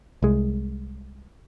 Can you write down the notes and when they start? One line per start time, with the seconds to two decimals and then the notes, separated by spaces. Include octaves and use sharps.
0.22 C2 G#3